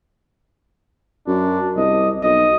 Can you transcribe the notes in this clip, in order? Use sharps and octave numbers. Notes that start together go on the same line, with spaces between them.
F#2 D4
C2 D#5
B1 D#5